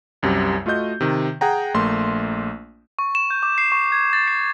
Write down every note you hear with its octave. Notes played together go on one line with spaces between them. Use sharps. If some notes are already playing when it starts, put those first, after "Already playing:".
C2 F#2 C3 G3
A3 F4 F#4 D#5 G6
C3 D#3
G#4 F#5 G5 A#5
A#1 A3 A#3 C6
C#6
E7
G6
D6
C7
C#6
G#6
A6
C7